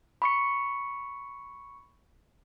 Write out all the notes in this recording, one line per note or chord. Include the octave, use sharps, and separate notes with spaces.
B5 C#6 C#7